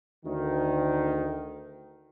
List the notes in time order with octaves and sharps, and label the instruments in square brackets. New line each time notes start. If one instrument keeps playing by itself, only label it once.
[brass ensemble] D2 D#3